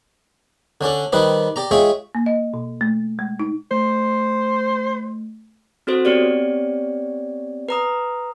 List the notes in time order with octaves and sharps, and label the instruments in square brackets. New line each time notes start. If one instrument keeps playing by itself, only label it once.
[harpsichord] D3 C#4 D4 A4
D#3 G3 D#4 B4 C5 D5
G4 D5 A#5
G#3 F4 G#4 C#5 E5 G5
[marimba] A#3
D#5
B2
A3
G#3
D#4
[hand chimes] A3 [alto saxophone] C5
[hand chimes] C4 F#4 A4 C5
B3 C4 G4 C#5 D5
B4 A#5 D#6